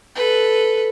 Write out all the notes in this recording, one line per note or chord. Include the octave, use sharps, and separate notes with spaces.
A4 B4